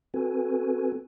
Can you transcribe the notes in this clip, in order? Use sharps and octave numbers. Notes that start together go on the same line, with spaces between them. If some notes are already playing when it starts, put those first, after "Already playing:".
C4 F#4 A4 B4 G#5